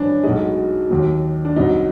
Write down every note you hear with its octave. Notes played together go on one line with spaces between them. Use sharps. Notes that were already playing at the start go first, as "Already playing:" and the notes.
Already playing: G#1 G2 E3 C#4 D4
B1 B2 G#3 D#4
D#2 D#3 F#3
D4
C2 B2 F#3 D#4